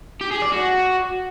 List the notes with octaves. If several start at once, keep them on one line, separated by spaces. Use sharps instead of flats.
G4
G#4
D5
F#4